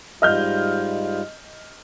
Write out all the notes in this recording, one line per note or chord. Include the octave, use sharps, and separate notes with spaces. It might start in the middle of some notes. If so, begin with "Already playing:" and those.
G#2 G3 F4 D#5 F6 G6